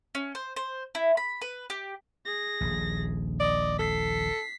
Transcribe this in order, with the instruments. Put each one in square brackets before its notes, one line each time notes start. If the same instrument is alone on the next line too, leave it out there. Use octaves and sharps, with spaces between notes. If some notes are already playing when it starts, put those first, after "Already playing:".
[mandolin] C#4
C5
C5
E4
B5
B4
G4
[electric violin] G#4 A#6
[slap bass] D#1 A#1
[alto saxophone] D5 [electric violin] D#5
[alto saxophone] A4 [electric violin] B6 C7